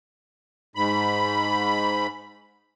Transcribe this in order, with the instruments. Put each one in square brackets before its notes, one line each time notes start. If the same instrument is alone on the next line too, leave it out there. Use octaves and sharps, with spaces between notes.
[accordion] G#2 B5